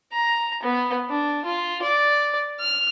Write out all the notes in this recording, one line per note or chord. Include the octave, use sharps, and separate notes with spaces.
A#5
B3
D4
F4
D5
F6